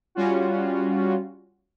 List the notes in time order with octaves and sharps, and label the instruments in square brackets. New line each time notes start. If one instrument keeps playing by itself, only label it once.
[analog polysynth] G3 C#4 F4 F#4